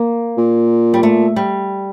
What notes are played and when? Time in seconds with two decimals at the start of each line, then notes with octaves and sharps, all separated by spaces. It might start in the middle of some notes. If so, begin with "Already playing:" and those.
Already playing: A#3
0.38 A#2
0.94 G3
1.03 A3
1.36 G3